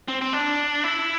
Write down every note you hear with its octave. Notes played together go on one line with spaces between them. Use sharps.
C4
C4
D4
E4